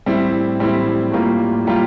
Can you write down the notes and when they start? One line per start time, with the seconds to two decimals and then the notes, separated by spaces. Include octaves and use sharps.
0.06 A2 G3 C4 E4
0.60 A2 G3 C4 E4
1.12 A2 G3 A#3 F4
1.65 A2 G3 A#3 F4